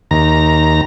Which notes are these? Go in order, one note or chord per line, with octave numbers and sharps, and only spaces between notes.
D#2 A#5